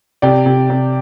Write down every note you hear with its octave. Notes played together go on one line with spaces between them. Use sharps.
C3 D5 G5
C3
C3